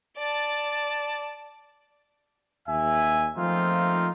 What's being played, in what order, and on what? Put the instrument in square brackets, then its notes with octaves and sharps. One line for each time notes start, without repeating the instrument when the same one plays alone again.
[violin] D5 A5
[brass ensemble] D#2 E5 G#5
F3 A3 A#3 C4 D#4 F4